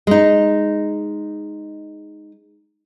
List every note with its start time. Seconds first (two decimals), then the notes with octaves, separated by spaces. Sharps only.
0.07 G#3 D#4